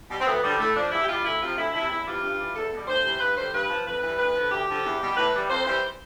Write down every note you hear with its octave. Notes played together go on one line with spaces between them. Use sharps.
B2 G3
C4
D2 B3
D3 F3 G3
A2 A3
F3 D4
E2 E4
G4
B2 G3 F4
D2 E4
C3 F3 F4
D2 E4
C3 F3 E4
E2 E4
C3 E3 G3 F4
G2
E3 G3
E2 A4
B2 G3
D2 C5
C3 E3 G3
G2 B4
D3 G3 C5
G2 B4
F3
F2 B4
E3 G3 B4
D2 B4
D3 F3
D2 G4
D3 F3
E2
B2 G3
A2 B4
E3 G3
F2 C5
E3 G3 C5